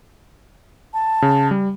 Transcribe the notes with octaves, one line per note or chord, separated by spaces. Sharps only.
A5
C#3
G3